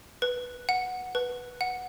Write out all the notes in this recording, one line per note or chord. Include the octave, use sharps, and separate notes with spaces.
B4
F#5
B4
F#5